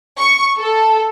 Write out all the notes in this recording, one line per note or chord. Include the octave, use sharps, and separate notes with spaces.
C#6
A4